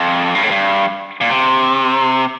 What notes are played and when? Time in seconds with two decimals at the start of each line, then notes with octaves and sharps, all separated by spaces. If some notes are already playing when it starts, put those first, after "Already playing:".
Already playing: F2
0.35 G2
0.43 A2
0.51 G2
1.21 A#2
1.30 C3